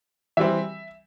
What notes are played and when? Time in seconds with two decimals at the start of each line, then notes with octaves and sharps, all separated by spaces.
0.37 E3 G3 C4 E5